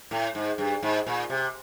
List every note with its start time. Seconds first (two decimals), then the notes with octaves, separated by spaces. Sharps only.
0.11 A2
0.35 G#2
0.58 G2
0.83 G#2
1.07 A#2
1.30 C3